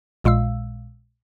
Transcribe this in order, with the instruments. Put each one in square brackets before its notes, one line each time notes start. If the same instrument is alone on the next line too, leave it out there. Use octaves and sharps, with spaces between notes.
[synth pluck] A#1 A#2 G#3 F5 E6